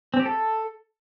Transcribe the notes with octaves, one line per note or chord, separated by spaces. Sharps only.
C4
G4
A4